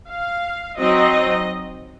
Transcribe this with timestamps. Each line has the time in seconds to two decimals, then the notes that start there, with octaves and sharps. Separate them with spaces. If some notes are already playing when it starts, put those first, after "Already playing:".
0.10 F5
0.79 F#3 C4 D#4 D#5